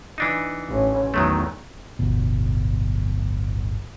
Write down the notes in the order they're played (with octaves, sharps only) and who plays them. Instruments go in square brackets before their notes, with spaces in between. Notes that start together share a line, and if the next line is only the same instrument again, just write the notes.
[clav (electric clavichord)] E3 D4 D#4
[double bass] A1 C#4
[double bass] E2 [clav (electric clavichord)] D#3 F#3 A3
[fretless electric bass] D1 G1 B2